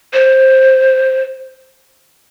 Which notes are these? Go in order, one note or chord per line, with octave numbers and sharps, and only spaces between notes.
C5